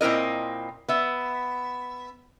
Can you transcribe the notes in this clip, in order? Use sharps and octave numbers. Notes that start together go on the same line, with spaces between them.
A#2 C4 E4 A#4 D#5
B3 E5